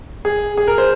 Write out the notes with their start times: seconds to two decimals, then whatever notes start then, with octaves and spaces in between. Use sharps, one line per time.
0.25 G#4
0.57 G#4
0.68 A#4
0.78 C5